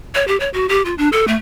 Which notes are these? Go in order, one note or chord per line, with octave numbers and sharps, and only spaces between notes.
C#5
G4
C#5
F#4
G4
F4
D4
A4
A3